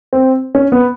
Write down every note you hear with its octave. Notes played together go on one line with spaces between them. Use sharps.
C4
C#4
B3